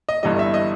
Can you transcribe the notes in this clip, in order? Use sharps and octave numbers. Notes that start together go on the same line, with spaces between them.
D#5
G1 G2 E3 G3 D#5
E5
D#5